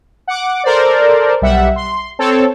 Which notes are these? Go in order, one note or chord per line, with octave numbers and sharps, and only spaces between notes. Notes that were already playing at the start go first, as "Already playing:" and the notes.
F#5 D6
A4 A#4 C5 D5
B1 G3 E5 F#5
C6
C4 A4 C#5